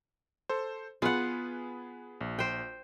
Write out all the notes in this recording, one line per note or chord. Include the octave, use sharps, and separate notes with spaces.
A4 C5
B3 F4 G#4 B4 F#5
A#1
C5 G5